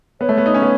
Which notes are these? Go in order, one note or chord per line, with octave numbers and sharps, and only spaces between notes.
B3 C#5
A3
B3
D#4
C#4
B3